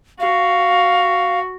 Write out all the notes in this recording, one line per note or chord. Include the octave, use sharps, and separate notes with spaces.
F#4 F5